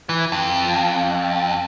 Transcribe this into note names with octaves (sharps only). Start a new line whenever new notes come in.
E3
F2